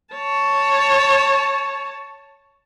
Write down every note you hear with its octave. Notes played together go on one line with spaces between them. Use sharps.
C#5 A5